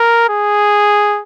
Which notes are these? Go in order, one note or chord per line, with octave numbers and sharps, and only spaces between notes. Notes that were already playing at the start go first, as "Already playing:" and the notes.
Already playing: A#4
G#4